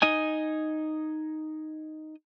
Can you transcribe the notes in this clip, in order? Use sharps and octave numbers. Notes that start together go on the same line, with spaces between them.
D#4 D#5 G#5